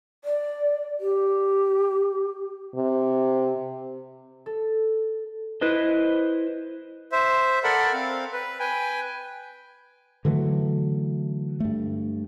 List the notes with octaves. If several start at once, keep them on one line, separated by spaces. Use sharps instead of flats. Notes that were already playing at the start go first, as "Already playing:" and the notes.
D5
G4
C3
A4
E4 B4 C5 D#5
C5 E5
A4 A#4 D5 F#5 B5
C4 F5
B4
B4 G5 G#5
D3 E3 F#3 A3
G2 A3